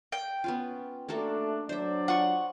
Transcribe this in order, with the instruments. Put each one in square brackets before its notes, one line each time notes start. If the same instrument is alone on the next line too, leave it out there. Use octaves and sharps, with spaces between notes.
[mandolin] G5
[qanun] B3 C#4 F4
[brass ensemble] A3 D4 [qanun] A#3 F#4 A4
[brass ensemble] F#3 D4 D5 [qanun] C5 E5
[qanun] F4 [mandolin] F#5 C#6